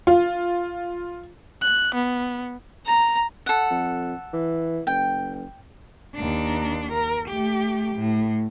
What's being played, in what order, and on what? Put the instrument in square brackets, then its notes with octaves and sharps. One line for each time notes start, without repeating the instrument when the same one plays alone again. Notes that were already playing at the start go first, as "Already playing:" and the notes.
[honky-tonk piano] F4
[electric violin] F#6
B3
[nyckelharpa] A#5
[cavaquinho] A4 F#5
[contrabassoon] F2
E3
[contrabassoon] F#1 [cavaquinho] G5
[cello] D#2 D4
A#4
A3 G4
A2